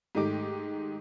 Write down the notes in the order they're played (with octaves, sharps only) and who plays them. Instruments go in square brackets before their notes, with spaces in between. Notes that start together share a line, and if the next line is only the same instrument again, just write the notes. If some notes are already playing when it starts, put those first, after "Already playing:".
[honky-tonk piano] G#2 D#3 A3 D#4 G4 D6